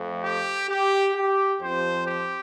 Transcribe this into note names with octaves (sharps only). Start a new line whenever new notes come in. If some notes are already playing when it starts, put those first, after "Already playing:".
Already playing: F2 F3 A3
G4
G4
G4
F2 F3 C4 C5
G4